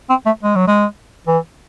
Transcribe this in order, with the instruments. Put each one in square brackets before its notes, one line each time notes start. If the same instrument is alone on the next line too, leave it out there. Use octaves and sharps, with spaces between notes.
[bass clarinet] C4
A3
G#3
F#3
G#3
E3